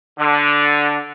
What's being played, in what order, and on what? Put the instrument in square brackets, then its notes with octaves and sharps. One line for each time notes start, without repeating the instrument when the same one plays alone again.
[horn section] D3